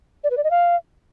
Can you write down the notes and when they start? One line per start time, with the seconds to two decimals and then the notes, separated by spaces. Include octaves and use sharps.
0.24 D5
0.30 B4
0.37 D5
0.44 D#5
0.51 F5